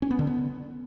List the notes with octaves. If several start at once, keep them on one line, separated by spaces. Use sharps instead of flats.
C#4
B3
D3
B3